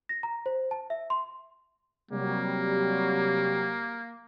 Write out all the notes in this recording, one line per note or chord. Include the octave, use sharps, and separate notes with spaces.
A#6
A#5
C5
A5
E5
C6
C3 F#3 G3 A#3